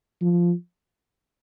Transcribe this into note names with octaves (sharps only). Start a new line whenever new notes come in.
F3